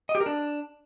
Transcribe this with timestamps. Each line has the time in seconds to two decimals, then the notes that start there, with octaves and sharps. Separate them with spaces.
0.09 D#5
0.15 G4
0.20 A#4
0.26 D4